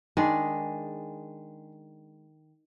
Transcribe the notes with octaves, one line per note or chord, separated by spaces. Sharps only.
D#3 G#3 D4 G#4